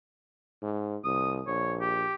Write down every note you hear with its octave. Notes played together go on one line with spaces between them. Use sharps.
G#2
C2 D#6
A#1 C#5
G4